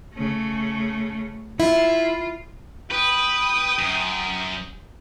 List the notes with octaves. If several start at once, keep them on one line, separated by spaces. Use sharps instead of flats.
C#3 A3
E4 F4
B4 G5 D#6
F#2